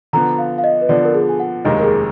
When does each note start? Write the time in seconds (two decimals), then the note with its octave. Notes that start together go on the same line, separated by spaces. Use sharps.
0.13 D3 F3 B3 A#5
0.39 F5
0.58 F5
0.64 D#5
0.82 B4
0.89 D3 F3 B3 D5
1.05 A#4
1.14 G#4
1.29 G#5
1.40 F#5
1.65 F1 D#2 D#3 G#3 D#5
1.79 A#4
1.84 G#4